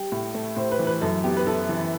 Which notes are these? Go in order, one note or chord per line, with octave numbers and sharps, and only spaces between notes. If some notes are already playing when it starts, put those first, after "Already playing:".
Already playing: G3 G5
A2
A3
A2 C5
B4
E3
B4
F#2 A4
B3 G4
B4
E4 A4
E3